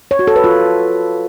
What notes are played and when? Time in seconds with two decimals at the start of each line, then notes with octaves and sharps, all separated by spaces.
0.11 C#5
0.19 F#4
0.27 A4
0.36 B4
0.44 F4